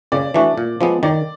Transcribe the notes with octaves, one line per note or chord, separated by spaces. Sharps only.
C#3 D5
E3 A3 D4 F#4
A#2
F3 G#3 B3
D#3 D5